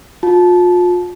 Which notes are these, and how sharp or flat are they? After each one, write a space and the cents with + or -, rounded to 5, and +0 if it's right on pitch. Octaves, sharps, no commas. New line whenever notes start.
F4 +35 A5 -20